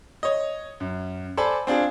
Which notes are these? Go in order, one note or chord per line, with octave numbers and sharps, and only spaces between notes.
C#5 D#5
F#2
A4 C5 D5 G#5 A5 B5
C4 D4 F4 G#4